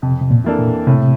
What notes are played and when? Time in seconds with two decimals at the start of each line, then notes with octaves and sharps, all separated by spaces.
0.02 F2 C3
0.21 C3
0.31 A#2
0.44 E3 A#3 D4 A4
0.59 A#2
0.87 A2 C3